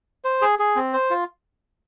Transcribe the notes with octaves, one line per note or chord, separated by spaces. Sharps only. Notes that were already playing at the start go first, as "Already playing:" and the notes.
C5
G#4
G#4
C4
C5
F4